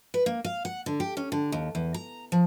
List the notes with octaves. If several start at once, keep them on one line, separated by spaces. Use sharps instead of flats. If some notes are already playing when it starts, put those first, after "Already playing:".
B4
A#3
F5
F#5
D3
G4
C#4
D3
D#2
E2
A#5
F3